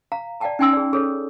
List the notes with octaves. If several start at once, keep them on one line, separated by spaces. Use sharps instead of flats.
F5 A#5
D5 D#5 F5 G5 A5 A#5
C#4 D#4 G5 G#5 C6 E6
G#4 D5
G#4 A4 C#5